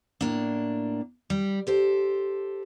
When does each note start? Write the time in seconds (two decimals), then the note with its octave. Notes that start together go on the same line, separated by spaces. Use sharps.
0.21 A2 A#3 D4
1.30 G3
1.67 G4 A4 C5